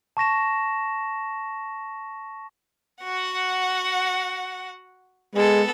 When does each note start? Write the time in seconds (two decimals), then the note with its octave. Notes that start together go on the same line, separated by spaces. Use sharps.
0.17 A5 C#6 A#6 E7
3.04 F#4 F#5
5.35 G#3 B3 A4